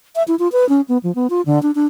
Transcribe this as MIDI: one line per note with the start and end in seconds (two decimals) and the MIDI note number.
0.16 0.23 76
0.28 0.36 64
0.39 0.48 65
0.52 0.68 71
0.69 0.81 61
0.88 0.98 59
1.03 1.14 53
1.15 1.27 59
1.30 1.41 65
1.46 1.61 50
1.63 1.71 62
1.75 1.86 62